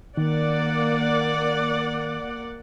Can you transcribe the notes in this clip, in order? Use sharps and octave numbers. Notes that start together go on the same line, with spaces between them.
D#3 A#3 D5 F#5